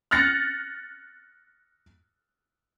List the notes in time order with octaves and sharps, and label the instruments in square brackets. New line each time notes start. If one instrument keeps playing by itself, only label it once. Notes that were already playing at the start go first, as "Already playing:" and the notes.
[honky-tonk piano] F6 F#6 A6 A#6 C#7